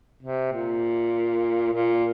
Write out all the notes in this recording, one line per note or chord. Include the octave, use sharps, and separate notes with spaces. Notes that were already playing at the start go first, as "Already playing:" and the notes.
C3
A#2
A#2